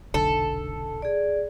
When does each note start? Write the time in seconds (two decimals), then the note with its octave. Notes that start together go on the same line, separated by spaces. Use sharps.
0.14 F1 B1 D3 A4
1.02 G#4 D5